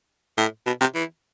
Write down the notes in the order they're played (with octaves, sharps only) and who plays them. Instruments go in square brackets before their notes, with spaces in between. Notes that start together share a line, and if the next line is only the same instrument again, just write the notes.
[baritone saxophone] A2
B2
C3
E3